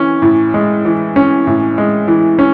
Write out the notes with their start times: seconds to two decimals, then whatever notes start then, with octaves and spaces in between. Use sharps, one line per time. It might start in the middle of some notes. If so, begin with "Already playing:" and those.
Already playing: E3 C#4
0.22 A2
0.54 G#3
0.85 E3
1.16 C#4
1.47 A2
1.78 G#3
2.08 E3
2.39 C#4